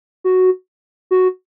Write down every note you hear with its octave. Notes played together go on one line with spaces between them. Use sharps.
F#4
F#4